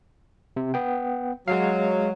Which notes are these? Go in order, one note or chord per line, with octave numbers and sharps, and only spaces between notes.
C3
B3 G5
F#3 G#3 F5